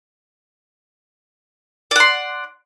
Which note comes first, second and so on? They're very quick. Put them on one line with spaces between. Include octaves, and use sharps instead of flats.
D5 F#5 C6